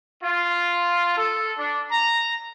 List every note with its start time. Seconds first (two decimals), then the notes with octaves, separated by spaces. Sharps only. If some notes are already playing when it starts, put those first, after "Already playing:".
0.22 F4
1.16 A4
1.58 D4
1.90 A#5